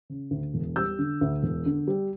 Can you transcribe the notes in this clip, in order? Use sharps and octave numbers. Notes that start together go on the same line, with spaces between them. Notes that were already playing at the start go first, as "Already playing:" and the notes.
C#3
D2
E1
G3 E6 G6
D3
D2
E1
D3
G3